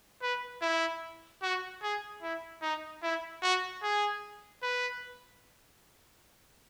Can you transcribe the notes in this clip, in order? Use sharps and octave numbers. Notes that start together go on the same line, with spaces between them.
B4
E4
F#4
G#4
E4
D#4
E4
F#4
G#4
B4